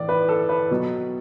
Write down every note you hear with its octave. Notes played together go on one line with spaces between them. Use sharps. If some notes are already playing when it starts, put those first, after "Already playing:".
Already playing: A2 E3 D5
B4
A4
B4
B2 F#3